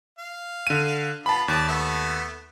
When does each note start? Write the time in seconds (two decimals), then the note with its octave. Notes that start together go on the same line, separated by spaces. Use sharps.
0.19 F5
0.67 D3 D#7
1.26 B3 F4 A5 B5
1.48 D#2 D5 A5
1.68 A3 B3 E5